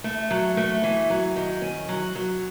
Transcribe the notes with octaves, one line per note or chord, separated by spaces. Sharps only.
A3
F#3
A3
E3
F#3
D#3
C#4
F#3
F#3